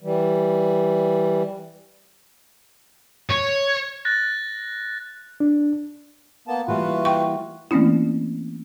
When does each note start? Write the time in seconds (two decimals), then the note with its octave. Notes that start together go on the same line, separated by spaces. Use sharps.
0.02 E3 G3
3.31 C#5
4.05 F#6 A6 A#6
5.40 D4
6.48 A#3 B3 A5
6.68 E3 G3 A#3 F4 F#4 B4
7.05 G5 C#6
7.71 E3 A3 A#3 C4 C#4 E4